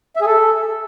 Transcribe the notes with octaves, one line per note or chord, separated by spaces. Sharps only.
E5
G#4
A4